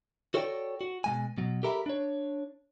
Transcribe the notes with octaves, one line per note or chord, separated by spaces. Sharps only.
F#4 A4 C#5 D5 F5 G5
F#4
B2 G#3 G#5
B2 F#3
G4 A4 A#4 E5 F5 B5
D4 C#5